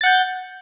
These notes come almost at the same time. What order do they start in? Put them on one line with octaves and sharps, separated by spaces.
A6 F#5 G6